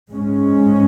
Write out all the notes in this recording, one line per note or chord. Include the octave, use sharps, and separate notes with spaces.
G#2 G#3 C#4